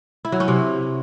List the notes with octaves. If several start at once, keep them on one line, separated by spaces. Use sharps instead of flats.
E4
F#3
C#4
C3